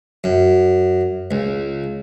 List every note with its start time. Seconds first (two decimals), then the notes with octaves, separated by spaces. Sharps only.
0.24 F#2
1.31 C#2